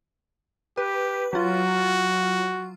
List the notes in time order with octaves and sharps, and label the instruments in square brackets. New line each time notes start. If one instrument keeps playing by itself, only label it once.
[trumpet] G4 [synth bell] B4
[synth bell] F#3 F4 [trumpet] F#4